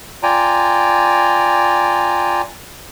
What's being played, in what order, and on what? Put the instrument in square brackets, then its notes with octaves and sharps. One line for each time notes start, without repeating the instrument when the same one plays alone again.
[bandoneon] F4 D5 G5 G#5 A#5